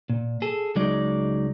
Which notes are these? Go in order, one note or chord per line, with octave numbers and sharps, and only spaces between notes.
A#2
G#4 A4
C#2 F#3 G#3 D#4 D5